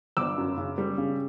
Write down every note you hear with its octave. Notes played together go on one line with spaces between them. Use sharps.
G1 D6 E6
F#2
C#3
G3
C#3